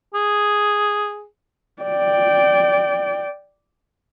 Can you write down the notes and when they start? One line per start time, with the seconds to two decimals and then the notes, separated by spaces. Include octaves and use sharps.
0.14 G#4
1.82 D5 G5